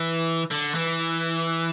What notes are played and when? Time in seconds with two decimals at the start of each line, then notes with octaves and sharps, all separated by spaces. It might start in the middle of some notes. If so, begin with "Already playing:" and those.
Already playing: E3
0.51 D3
0.75 E3